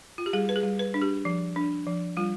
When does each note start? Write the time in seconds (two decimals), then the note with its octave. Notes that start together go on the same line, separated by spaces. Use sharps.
0.18 F4
0.26 G4
0.33 G3 G#4
0.49 B4
0.56 G#4
0.63 G3
0.79 B4
0.94 D4
1.02 G4
1.25 F3
1.56 D4
1.87 F3
2.17 G3 F4